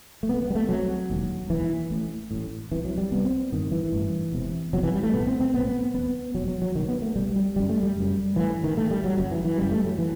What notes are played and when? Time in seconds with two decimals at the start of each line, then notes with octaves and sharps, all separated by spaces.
0.23 A3
0.29 C2 C3 B3
0.42 B3
0.50 G3
0.55 A3
0.69 C2 C3 F#3
1.10 E1 D#2
1.50 E1 D#2 E3
1.90 A1 A2
2.31 A1 A2
2.71 C2 C3 E3
2.84 F#3
2.98 G3
3.11 C2 C3 B3
3.25 C4
3.52 A1 G2 D#3
3.71 E3
3.92 A1 G2
4.32 E1 E2 C3
4.73 E1 E2 C3 F#3
4.83 E3
4.94 G3
5.03 A3
5.14 B1 A2 B3
5.27 C4
5.40 C4
5.54 B1 A2 B3
5.67 B3
5.94 E1 D#2 B3
6.35 E1 D#2 F#3
6.48 F#3
6.62 F#3
6.75 C2 B2 D#3
6.89 B3
7.02 A3
7.15 C2 B2 G3
7.36 G3
7.56 F#1 F#2 G3
7.69 A3
7.83 G3
7.96 F#1 F#2
8.36 A1 A2 E3
8.64 D#3
8.77 A1 A2 A3
8.90 G3
9.04 F#3
9.17 F#1 F#2 F#3
9.31 E3
9.45 E3
9.58 F#1 F#2 G3
9.72 A3
9.85 F#3
9.98 E3